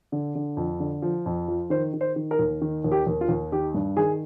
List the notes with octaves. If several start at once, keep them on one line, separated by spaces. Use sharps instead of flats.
D3
D3
F2
D3
F3
F2
F3
D#3 C5
D#3
C5
D#3
A#4
D#2
D#3
D#2
G4
D#2
F4
D#2
D#3 G4
G2
D#3 G#4